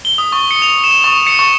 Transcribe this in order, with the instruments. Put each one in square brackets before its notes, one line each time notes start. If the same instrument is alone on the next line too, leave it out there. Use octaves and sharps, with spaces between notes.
[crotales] G7
D#6
C#6
C#7
F7
E7
C#6
C#7
C#6